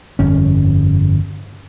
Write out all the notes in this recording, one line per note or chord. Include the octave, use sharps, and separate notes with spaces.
G1 F2 C#4